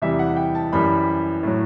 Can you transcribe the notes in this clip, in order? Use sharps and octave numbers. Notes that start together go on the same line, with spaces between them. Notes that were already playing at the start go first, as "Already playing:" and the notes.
E2 C3 E3 G3 E5
F#5
G5
A5
F#2 E3 G3 B5
A2 F#3